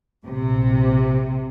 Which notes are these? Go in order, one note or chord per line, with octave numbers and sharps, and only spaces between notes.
A#1 C3